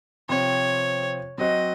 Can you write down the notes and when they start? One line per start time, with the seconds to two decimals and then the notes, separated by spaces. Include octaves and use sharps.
0.29 C3 F3 C4 C#5
1.38 F#3 C4 F#4 C5 D#5